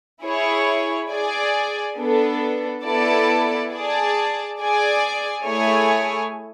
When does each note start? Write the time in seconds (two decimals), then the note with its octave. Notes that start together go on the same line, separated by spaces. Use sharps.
0.22 E4 G#4 C#5
1.09 G#4 D5 G#5
1.97 B3 D4 A4
2.84 B3 E4 A4 D5 A5
3.70 G#4 D5 A5
4.58 G#4 D5 G#5
5.45 A3 E4 G#4 C#5 G#5